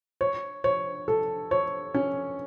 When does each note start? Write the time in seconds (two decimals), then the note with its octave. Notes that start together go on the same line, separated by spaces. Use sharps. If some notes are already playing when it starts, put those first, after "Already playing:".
0.21 C#5
0.64 C#5
1.08 A4
1.51 C#5
1.94 C#4